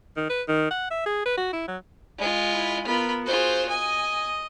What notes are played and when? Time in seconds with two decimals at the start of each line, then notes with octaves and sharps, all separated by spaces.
0.17 D#3
0.30 B4
0.48 D#3
0.71 F#5
0.91 E5
1.06 G#4
1.26 B4
1.37 F#4
1.53 E4
1.68 F#3
2.18 G#3 F4
2.52 E4 B5
2.86 B3 F4 A#4 B5
3.26 F4 F#4 G#4 C5
3.69 D#5 G#5